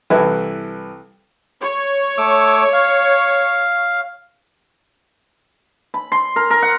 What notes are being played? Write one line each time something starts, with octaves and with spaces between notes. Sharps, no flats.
C2 E3 E4 A4 B4
C#5
A3 D6 E6
F5
B5
C6
A#4
A#4
F#5